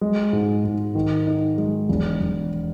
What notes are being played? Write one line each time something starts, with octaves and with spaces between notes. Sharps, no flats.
G#3
G#2
G#2
D#3
D#4
G#3
E1
E1